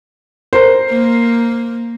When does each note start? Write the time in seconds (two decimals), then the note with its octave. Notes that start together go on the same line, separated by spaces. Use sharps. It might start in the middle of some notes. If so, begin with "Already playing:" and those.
0.53 A#4 C5
0.89 A#3